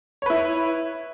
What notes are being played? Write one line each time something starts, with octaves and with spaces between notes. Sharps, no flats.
E4 B4 C#5